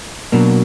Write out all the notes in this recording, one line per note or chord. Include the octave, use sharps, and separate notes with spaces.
B2 F#3 A#3 D4